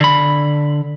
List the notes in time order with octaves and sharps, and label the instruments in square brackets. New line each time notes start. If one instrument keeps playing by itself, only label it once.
[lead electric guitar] D3 B5